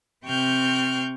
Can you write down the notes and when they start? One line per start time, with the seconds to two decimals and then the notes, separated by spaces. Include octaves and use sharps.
0.24 C3 C4 G5 C#6 F6 G6